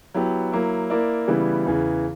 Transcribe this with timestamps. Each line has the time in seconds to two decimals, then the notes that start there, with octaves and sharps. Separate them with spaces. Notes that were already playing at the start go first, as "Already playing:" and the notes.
0.14 F#3 B3 E4 G4
0.52 F#3 A#3 E4
0.90 A#3 E4 A#4 D5
1.27 C#3 E3 G3 B3 E4
1.66 E2 C#3 E3